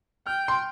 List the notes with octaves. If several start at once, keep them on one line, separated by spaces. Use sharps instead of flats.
G5 F6
C6